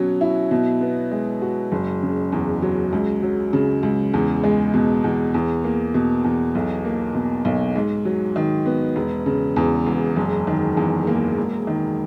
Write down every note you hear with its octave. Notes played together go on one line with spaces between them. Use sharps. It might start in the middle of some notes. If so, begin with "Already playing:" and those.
Already playing: B2 F#3 C#4
E4
B2
B3
G#3
F#4
F#1
C#3
E2
F#3
C#2
F#3
C#3
C#2
E2
G#3
B2
E2
E2
A#3
B2
E2
B1
A#3
B2
B1
G#2
F#3
D#3
B3
E1
C#3
E2
E1
F#1
D#3
E2
A#3
E1
D#3